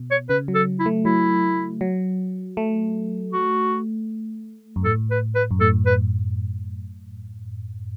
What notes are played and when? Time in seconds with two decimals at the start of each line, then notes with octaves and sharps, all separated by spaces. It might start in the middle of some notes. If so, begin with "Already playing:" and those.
Already playing: B2
0.11 C#5
0.29 C#3 B4
0.48 F#3
0.55 A4
0.79 E4
0.86 A3
1.05 F#3 E4
1.81 F#3
2.57 A3
3.33 F#4
4.76 F#2
4.85 A2 A4
5.11 B4
5.35 B4
5.51 F#2
5.61 A2 A4
5.86 B4